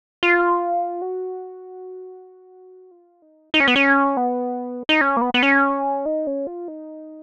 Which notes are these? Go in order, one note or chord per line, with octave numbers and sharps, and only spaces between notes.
F4
F#4
F4
D#4
D#4
C#4
B3
C#4
B3
D#4
C#4
A#3
B3
B3
C#4
D#4
C#4
F4
D#4